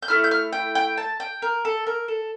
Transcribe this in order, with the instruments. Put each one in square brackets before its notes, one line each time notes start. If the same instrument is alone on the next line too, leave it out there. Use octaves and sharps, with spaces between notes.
[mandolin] G6
A3 E4 F6
G6
F6
G5
G5
A5
G5
A#4
A4
A#4
A4